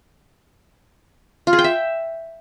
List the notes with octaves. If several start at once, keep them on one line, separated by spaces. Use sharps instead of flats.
F4
G#4
G5
E5